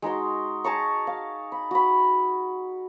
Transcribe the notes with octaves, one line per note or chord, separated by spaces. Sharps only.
G#3 D#4 F#4 C6
G#4 A5 A#5 C#6
F5
B5
F#4 B5